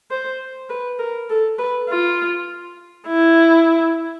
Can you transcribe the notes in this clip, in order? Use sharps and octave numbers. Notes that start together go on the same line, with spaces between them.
C5
B4
A#4
A4
B4
F4
E4